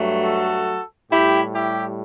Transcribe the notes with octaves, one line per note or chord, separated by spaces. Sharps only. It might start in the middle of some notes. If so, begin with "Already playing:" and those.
Already playing: G2 F#3 A3
F#4 A4
A2 G3 E4 G4
E4 G4